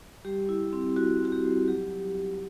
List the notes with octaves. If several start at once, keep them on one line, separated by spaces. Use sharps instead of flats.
G3 G4
E4
C4
E4 F#4
C4 F#4
G4
G3
F#3 G4